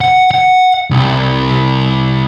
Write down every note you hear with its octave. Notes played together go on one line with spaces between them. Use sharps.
F#5
F#5
C2